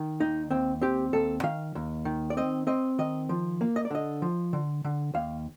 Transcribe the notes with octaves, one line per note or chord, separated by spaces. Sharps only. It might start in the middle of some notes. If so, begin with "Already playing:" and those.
Already playing: D#3
D#2 D#4
D#2 C4
C4 G4
D#2 A4
D#3 F5
D#2
D#3
D5
C4 D#5
C4 D#5
D#3 D#5
F3
A#3
D#5
D5
D3 D#5
F3
D3
D3
D#2 F5